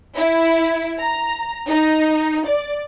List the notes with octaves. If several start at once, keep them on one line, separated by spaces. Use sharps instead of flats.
E4
A#5
D#4
D5